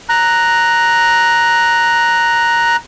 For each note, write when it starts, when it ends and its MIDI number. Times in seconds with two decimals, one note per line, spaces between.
0.09 2.76 82
0.09 2.76 90